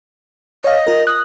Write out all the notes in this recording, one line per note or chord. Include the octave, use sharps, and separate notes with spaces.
C#5 D#5 F5
F4 A#4
D#6 F#6